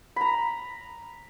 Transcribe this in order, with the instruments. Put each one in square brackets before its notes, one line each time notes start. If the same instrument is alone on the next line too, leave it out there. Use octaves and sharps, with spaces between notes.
[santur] A#5 B5